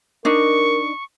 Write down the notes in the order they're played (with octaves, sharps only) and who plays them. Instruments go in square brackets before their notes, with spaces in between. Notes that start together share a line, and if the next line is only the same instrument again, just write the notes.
[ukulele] D4 D#4 D#5 [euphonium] A#4 [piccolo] C#6